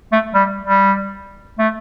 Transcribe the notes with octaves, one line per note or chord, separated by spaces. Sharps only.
A3
G3
G3
A3